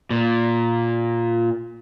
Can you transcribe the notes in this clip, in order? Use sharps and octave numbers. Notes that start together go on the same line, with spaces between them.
A#2